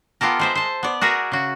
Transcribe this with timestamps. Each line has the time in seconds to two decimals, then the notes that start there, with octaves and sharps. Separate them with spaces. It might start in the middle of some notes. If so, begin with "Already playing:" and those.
0.21 B3 F4 G4 A4 A#4
0.39 G#3 C5 E5
0.55 C5 A5
0.83 B3 D5
1.01 F#4 G#4 A#4 E5
1.32 C#3 F#4